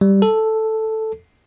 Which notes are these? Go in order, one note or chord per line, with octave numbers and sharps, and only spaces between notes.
G3
A4